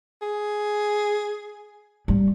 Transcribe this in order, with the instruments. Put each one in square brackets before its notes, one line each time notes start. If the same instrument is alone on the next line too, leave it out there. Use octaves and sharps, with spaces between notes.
[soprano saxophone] G#4
[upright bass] G3